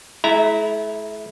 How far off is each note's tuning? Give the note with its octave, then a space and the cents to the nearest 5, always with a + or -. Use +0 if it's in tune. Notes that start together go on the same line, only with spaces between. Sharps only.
A3 -45 E4 -10 A#5 +0